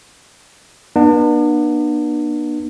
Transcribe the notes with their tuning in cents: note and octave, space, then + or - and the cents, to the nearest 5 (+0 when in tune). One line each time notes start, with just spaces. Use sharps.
B3 -40 D4 +40